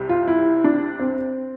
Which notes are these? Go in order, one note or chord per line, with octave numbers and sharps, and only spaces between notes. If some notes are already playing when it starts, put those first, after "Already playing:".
Already playing: C2 C3 G3
F4
E4
D4
C4